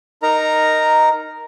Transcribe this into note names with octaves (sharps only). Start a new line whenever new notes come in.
D#4 A#4 A#5